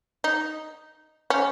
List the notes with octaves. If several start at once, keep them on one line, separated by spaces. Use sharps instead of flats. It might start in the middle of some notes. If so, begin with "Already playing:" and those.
D#4
C#4